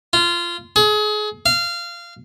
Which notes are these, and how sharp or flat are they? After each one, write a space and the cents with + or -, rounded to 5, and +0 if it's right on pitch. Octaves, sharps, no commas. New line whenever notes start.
F4 -20
G#4 +30
F5 -20